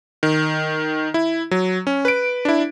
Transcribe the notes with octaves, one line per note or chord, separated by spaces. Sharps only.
D#3
E4
F#3
C#4
B4 D7
D4 E4